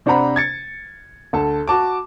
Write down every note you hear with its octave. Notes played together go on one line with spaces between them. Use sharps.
C3 D4 C5 F#5 A#5 B5
G#6 A6 C#7
D2 A4 A5
F#4 A5 D6